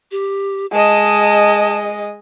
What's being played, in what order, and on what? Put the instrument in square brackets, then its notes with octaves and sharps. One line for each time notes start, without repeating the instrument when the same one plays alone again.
[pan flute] G4
[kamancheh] G#3 D#5 [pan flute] A5